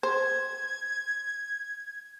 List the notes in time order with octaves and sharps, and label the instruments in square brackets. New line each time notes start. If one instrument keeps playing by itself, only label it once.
[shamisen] C5 [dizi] G#6